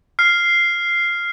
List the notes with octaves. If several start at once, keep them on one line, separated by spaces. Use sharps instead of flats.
F6 C7